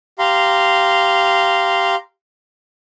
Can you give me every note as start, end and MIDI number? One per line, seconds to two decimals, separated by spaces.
0.19 1.95 67
0.19 1.95 77
0.19 1.95 82
0.19 1.95 84